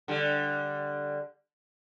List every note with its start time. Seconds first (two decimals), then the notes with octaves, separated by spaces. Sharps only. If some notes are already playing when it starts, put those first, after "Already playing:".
0.08 D3 G3